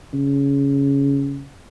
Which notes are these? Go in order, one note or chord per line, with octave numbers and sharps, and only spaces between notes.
C#3